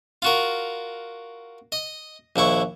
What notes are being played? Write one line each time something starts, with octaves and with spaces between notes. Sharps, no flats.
F4 F#4 A#4
D#5
A#1 D#2 E4 C#6